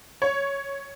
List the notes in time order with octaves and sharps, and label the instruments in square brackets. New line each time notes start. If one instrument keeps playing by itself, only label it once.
[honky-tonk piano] C#5